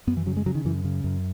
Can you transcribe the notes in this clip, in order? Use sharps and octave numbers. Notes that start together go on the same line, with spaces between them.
F#2 B3
E3
C#3 F#3
G#3
C#3 F#3
D#3
F#2 E3
C#3
F#2